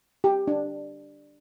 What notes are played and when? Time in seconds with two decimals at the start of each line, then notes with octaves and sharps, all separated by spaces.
0.24 G4
0.48 D4